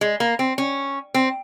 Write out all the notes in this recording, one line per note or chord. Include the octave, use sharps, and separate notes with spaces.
G#3
A#3
C4
C#4
C4